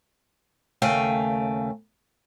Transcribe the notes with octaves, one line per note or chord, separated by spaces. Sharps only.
D#2 C#3 A3 F5 G5 G#5